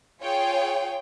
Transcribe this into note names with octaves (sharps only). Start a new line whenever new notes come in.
F4 G#4 C#5 G5